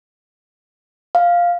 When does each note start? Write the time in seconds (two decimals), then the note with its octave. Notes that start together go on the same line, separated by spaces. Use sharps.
1.15 F5